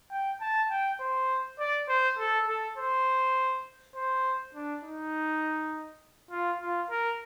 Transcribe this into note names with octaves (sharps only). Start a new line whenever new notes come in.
G5
A5
G5
C5
D5
C5
A4
A4
C5
C5
D4
D#4
F4
F4
A#4